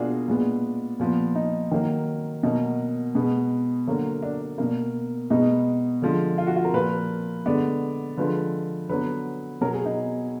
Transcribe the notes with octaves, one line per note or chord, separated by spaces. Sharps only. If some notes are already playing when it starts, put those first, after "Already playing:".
Already playing: B2 A#3 D4 F4 F#4 G#4
A#2 G#3 B3
A#2 F3 B3
D#4
D#3 F#3 A#3
B2 F#3 A#3 D#4
B2 G#3 B3
D3 F#3 A#3
D4
B2 A#3
B2 G#3 B3 D#4
D3 F3 G#3
F4
F#4
F4
A#4
A#2 F3 A#3 B4
D3 G#3 B3 D5
D3 F3 G#3 B4
D3 F#3 B3 B4
B2 F#3 B3 A#4
G#4
D#4